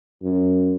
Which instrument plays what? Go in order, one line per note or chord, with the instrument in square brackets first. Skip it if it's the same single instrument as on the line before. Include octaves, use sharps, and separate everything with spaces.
[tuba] F#2